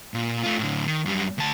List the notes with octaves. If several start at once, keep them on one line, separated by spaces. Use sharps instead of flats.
A#2
A3 F4
A2 D3
D#3
F#2 G3
D2 A5